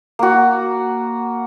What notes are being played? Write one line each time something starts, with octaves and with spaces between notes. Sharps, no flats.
A#3 F#4